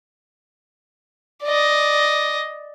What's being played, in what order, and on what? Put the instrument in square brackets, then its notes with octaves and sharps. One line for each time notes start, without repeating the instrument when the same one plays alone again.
[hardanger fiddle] D5 D#5